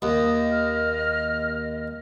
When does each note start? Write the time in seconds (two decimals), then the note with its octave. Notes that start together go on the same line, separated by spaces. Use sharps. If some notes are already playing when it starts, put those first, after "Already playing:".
0.02 D#2 D#5 D#6
0.52 F6